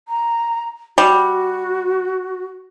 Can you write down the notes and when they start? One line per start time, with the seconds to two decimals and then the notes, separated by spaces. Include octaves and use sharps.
0.08 A#5
0.98 G3 F#4